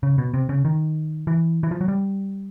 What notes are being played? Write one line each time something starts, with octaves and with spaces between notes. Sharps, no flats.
C#3
B2
C3
C#3
D#3
E3
E3
F3
F#3
G3